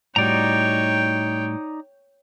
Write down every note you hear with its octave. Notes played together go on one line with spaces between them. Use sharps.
A2 G3 D#4 F#4 C#5 D5 G5 A#5